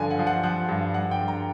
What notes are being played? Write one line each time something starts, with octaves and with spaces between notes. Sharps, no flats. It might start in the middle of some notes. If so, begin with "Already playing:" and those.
Already playing: G2 D3 F3 F5 G#5
F#5
F3
F#5
F3 F#5
G2
G2 F#5
G5
G2
A#5